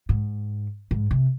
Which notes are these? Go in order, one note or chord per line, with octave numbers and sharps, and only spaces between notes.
G#2
G#2
C3